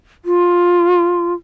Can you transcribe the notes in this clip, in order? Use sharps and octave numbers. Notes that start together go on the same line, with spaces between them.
F4